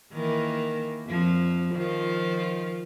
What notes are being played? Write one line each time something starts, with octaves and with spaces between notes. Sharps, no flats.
D#3 E3 A#3
F2 F3
D#3 F3 F4